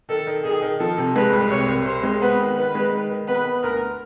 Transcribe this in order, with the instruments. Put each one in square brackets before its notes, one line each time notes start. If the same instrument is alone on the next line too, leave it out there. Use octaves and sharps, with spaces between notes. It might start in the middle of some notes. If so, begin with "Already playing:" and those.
[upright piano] D#3 [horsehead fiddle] A4
[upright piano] D#3
[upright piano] D#3 [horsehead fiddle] G#4
[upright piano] D#3
[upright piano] F3 [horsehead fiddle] A4
[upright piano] C3
[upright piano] G#3 [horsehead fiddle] B4
[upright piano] C2
[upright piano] C3 [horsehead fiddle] C#5
[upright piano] C2
[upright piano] C3 [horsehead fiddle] C5
[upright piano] G#3
[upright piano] B3 [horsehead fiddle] B4
[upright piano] D#3
[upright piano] D#3 [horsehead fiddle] B4
[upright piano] G#3
D#3
D#3
[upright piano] B3 [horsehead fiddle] B4
[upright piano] B3
[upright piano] D2 [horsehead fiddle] A#4